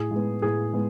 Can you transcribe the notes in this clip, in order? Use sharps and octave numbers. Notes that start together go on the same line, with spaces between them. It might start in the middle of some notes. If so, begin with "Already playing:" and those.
Already playing: A2 G#4
G#3 B3
A2 G#4
G#3 B3